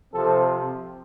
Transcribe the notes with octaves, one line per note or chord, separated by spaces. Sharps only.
C3 F3 C4 A4